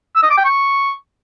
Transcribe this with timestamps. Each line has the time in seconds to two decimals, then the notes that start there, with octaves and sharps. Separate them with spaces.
0.16 E6
0.23 D#5
0.30 D6
0.38 G5
0.45 C#6